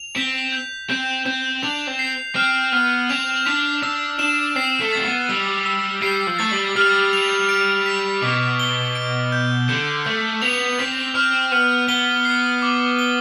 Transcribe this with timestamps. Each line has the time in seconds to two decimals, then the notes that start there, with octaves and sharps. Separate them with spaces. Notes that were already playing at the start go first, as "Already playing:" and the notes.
Already playing: F7
0.16 C4 B6
0.52 G6
0.90 C4 G6
1.26 C4 G6
1.63 D4 F7
1.87 C4
1.99 C7
2.36 C4 F6
2.72 B3 F6
3.09 C4 F7
3.45 D4 B6
3.83 D4 E6
4.19 D4 E7
4.56 C4 C7
4.80 A3
4.93 C4 A6
5.04 B3
5.29 G3 E6
5.66 E6
6.02 G3 C7
6.27 F3
6.39 A3 A6
6.51 G3
6.76 G3 F6
7.13 F7
7.49 D7
7.86 B6
8.22 B2 D6
8.59 G7
8.95 D7
9.32 G6
9.69 D3 G6
10.05 A3 G6
10.42 B3 F7
10.79 C4 B6
11.15 C4 F6
11.52 B3 F6
11.89 B3 G7
12.25 C7
12.62 D6
12.99 G7